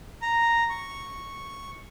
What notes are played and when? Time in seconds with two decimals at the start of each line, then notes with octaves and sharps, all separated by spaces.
0.22 A#5
0.70 C#6